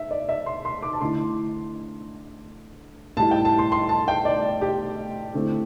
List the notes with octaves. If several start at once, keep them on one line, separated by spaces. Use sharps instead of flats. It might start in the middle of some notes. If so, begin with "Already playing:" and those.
Already playing: E5
D5
E5
C6
C6
D6
A5
D3 A3 E4 C6
A2 G3 E4 A5
G5
A5
C6
C6
A5
G5
D5
G4
D3 A3 C4 E4